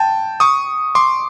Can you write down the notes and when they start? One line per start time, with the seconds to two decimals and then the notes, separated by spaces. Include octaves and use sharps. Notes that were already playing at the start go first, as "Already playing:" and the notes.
Already playing: G5 A5
0.40 C#6 D#6
0.95 C6 D6